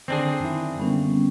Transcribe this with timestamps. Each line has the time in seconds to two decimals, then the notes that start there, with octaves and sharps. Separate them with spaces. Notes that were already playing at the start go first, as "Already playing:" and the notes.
0.08 D3 D#3 C4 D4 G#4
0.40 F#2 D#3 E4
0.78 D3 G3 A#3 B3 C#4